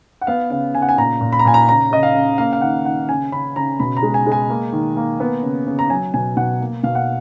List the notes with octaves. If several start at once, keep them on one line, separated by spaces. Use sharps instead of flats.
F#5
B3 F5
C#3 F5
C#3 G#5
F#5
G#5
A#2 A#5
A#2
B5
A#5
A#2 G#5
A#5
C#3 A#5
C#3 D#5
F5
C#3
A#3 F5
F5
D#3 F#5
D#3 F#5
C#3 G#5
C#3 B5
C#3 A#5
B2 B5
A#5
G#3
G#5
G#3
G#5
A#3
D#3
A#3
B3
C#3
C#3
A#5
F#3 G#5
B2 G#5
B2 F#5
A#3
B2 F5
F#5